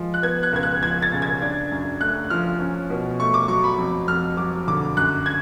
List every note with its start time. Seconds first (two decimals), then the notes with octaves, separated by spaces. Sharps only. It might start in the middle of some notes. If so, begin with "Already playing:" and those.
Already playing: F3 G#3
0.14 F#6
0.23 B3 G#6
0.43 F#6
0.53 C#2 G#6
0.63 F#6
0.83 F3 G#6
1.02 A6
1.12 C#3
1.22 G#6
1.42 D4
1.71 F#2
2.00 A3 F#6
2.30 F3 F6
2.60 C#4
2.90 B2
3.20 A3 C#6
3.34 D6
3.48 F#3 C#6
3.64 B5
3.78 F2
4.08 F2 F6
4.37 F#3 D6
4.67 D3 D6
4.97 F#2 F#6
5.26 G#6